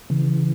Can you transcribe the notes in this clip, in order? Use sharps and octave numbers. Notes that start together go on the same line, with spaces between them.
C#3 E3